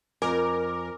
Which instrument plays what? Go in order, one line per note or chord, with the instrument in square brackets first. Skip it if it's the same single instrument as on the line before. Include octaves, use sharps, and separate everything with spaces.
[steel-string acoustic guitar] F2 [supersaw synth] A#4 [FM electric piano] G#5 D6